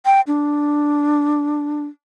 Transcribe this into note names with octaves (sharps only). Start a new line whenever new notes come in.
G5
D4